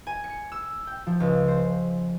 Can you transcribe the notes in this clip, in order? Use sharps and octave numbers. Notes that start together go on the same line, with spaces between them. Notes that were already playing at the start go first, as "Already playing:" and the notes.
G#5
C#7
E6
G5
F3
C#2
C5